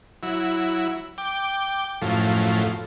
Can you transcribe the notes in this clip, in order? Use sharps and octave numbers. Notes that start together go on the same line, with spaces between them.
F#3 E4
G5 D6
F#2 A2 F3